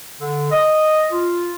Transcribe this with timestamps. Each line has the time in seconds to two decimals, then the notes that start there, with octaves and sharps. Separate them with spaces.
0.20 D3
0.52 D#5
1.12 F4